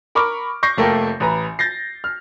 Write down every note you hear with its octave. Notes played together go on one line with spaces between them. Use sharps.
A#4 B5 C#6 D6 F6
C#6 G6 A#6 C7
F1 A3 A#3 A#4 G5
A1 B4 A#5
G6 A6 A#6 C7
F6